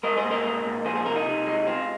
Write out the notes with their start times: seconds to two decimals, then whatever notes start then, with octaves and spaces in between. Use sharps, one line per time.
0.03 G#3 A#4 D#5
0.17 G#4 C5
0.24 A#2
0.31 A#4 D#5
0.45 G#3
0.65 A#2
0.85 F3 G#4 C5
0.96 G#4 C5
1.06 C3 F4 A#4
1.16 D#4
1.26 C3
1.46 G#3
1.66 G#3 C4 F4